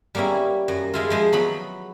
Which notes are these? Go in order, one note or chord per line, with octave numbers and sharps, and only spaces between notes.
G3 A#3 B3 C#4 E4
F#2
G#3 E4 F4
F3 G#3 C5
F#3 B3 B5